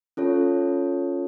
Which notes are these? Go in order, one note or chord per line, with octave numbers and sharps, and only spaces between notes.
C#4 F4 A4 C#5